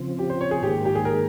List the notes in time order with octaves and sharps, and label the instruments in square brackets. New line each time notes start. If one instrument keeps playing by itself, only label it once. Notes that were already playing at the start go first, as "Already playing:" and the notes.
Already playing: [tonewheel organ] C#3 F3 C4
[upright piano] G4
C5
C#5
G#4
[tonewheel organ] G#2 D#3 A#3 [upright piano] G4
[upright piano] G4
G#4
A#4